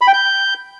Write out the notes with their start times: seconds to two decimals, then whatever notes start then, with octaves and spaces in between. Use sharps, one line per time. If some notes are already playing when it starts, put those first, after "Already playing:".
0.01 B5
0.07 G5
0.14 G6